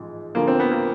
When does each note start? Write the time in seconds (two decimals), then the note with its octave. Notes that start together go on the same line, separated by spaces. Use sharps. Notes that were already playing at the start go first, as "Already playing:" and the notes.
Already playing: A1 G#2 F3
0.35 D2 D3 F3 A#3
0.48 C4
0.60 B3
0.71 A#3